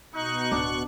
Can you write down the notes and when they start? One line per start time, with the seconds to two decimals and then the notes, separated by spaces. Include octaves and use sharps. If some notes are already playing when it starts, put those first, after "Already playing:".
0.14 B2 D#4 C#6 F#6
0.52 D1 D4